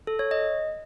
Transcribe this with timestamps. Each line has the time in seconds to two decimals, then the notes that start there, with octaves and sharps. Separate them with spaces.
0.07 A4
0.19 C#5
0.31 D#5